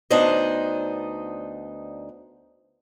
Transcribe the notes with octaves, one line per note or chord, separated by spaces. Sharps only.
D2 B3 D4 D#4 C5 D#5